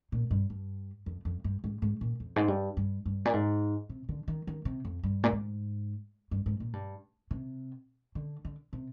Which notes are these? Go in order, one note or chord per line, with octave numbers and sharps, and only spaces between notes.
A#2
G2
G2
F2
F2
G2
G#2
G#2
A#2
F2
G#2
G2
G2
G2
A#2
G#2
C3
D3
D#3
D#3
C3
F2
G2
A#2
G#2
G2
G#2
A#2
G2
C3
D3
D3
C3